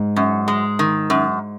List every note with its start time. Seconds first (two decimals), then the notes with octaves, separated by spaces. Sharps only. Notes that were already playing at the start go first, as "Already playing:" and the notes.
Already playing: G#2
0.16 F#2
0.48 G#3
0.79 D#3
1.10 F#2